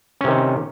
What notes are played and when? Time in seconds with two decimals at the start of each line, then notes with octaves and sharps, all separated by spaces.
0.21 C#4
0.24 C3
0.28 D#3